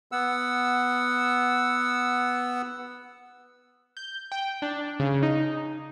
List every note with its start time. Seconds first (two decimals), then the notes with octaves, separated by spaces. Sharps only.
0.12 B3 F#5 E6
3.97 G6
4.32 G5
4.62 D4
5.00 C#3
5.23 D#4